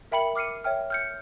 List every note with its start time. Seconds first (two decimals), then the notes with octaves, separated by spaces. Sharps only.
0.12 A#4 E5 G5 B5 C#7 F#7
0.36 D6 F6 C7 C#7 D#7
0.64 C#5 E5 G5 F6
0.90 F6 G6 C#7